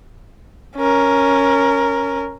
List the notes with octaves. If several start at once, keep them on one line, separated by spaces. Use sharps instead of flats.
C#4 A#4